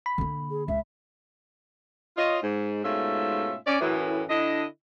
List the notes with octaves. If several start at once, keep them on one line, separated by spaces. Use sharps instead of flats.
B5
D3 A#3
G#4
C#2 E5
F4 C#5 D#5
G#2
G#2 B2 A3 C#4 F4 E5
C#4 D5
F#2 A2 E3
D3 D4 E4 D#5